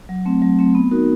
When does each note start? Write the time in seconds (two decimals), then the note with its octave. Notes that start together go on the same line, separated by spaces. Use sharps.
0.09 F#3
0.26 A3 C4
0.42 F#3
0.59 A3 C4
0.75 B3
0.91 D#4 F#4 A#4